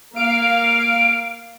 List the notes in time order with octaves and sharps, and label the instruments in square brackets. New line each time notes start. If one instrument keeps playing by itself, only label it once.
[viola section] A#3 F5 [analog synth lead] D7